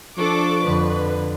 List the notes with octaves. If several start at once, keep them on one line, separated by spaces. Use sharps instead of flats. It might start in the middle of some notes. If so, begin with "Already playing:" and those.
F3 D4 A4 C#6 D6
F2 D3 B4